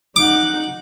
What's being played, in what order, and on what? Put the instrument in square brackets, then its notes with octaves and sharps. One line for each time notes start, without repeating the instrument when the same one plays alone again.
[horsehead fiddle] D#4 F#5 [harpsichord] D6